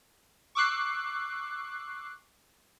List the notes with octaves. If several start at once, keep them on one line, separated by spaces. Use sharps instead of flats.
C#6 D6 E6 F#6 C7